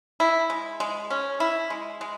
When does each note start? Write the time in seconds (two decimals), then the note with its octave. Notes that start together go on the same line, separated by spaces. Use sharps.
0.20 E4
0.50 G#3
0.80 G#3
1.10 C#4
1.40 E4
1.70 G#3
2.01 G#3